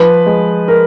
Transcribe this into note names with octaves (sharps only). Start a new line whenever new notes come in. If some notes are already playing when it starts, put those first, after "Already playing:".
Already playing: F3 B4
G#3
A#4